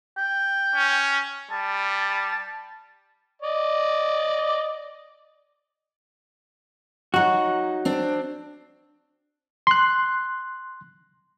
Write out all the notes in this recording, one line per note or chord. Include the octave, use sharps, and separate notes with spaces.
G5
C#4
G3 A5
D5 D#5
F#3 D#4 F#4
C4 D4
C6 F#6